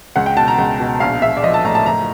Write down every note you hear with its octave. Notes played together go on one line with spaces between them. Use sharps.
C#2 F#5
G5
B2 A5
A#5
C#2
B2
A#1 F5
A#1 E5
D5
F3 D#5
A5
A2 A#5
A5
F#1 A#5